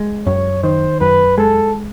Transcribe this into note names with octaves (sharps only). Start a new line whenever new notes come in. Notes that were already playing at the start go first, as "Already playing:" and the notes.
Already playing: G#3
F#2 C#5
D#3 C5
F#2 B4
G#3 A4